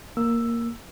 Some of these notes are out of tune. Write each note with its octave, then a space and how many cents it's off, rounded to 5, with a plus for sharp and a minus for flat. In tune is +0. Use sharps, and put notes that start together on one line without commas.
A#3 +0 E6 +5